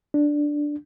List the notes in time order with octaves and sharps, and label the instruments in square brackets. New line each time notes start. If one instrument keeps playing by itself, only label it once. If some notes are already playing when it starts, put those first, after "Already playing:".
[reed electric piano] D4